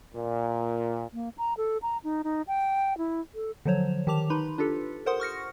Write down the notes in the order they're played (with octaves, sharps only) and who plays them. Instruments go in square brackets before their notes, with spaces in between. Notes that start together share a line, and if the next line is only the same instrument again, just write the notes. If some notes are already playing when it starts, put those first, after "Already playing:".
[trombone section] A#2
[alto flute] A#3
A#5
A4
A#5
D#4
D#4
G5
E4
A4
[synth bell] D3 F3 F#3 C5 C#5
D#3 G4 A5 D6 F7
D#4 B4 B5 C6
D4 F4 G4 A4
A#4 C5 F#5 C6 D#6
C#6 F6 A#6 C#7